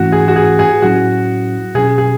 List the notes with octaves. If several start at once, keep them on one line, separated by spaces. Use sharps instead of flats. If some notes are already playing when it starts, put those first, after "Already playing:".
Already playing: G#2 E3 A3 C#4 E4 F#4
G#4
F#4
G#4
G#4
A2 F#3 C#4 E4 F#4
B2 F#3 C#4 G#4
G#4